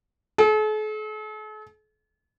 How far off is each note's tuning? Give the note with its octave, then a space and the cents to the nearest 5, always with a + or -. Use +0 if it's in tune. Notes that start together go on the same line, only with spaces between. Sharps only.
A4 -45